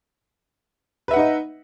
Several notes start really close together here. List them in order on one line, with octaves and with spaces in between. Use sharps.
B4 E5 F#5 D#4 D#5